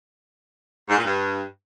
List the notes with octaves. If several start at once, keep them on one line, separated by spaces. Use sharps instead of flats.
G#2
A#2
G2